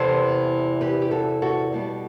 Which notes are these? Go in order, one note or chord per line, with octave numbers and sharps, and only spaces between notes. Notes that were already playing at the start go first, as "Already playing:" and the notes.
Already playing: E2 C3 E3 B3 A4 C5
G4 B4
G4
F#4 A4
F#4 A4
B2 G3 B3